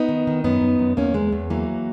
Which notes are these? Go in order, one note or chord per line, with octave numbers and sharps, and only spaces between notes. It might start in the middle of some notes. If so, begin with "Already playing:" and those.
Already playing: B3 D#4
D#3
D#3
F#2 B3 D#4
F#2
F#2
E2 A#3 C#4
E2 G#3
E2
E3 F#3 A#3